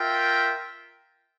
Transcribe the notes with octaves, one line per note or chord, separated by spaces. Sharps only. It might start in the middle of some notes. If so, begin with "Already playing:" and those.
Already playing: F4 A#4 E5 G5